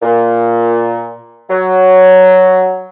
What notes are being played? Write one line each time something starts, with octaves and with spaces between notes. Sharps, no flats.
A#2
F#3